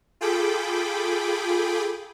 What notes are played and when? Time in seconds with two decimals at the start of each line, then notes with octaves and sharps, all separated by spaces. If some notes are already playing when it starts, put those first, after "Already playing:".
0.21 F4 G#4 A4 G5 B5 D6